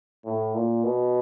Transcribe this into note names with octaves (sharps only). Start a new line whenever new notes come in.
A2
A#2
B2